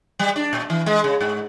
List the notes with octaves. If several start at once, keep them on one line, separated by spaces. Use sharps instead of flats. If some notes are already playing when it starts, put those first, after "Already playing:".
G3
D4
A#2
E3
G#3
C#3
G#2